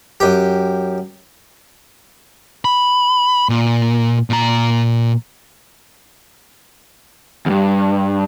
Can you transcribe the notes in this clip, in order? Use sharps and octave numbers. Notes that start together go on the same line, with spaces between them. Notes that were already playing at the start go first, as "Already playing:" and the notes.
F#2 G4
B5
A#2
A#2 A#5
E2 G2